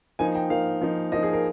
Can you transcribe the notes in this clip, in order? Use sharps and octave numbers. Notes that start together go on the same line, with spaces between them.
F3 A#3 D#4 G#5
G5
F3 A#3 D#4 F5
F3 A#3 D#4
F3 A#3 D#4 D#5
G#4
A#4